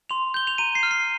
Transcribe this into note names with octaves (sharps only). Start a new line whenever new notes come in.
C6 F7
G6 G7
F7
A#5 D#7
C7
F6
C7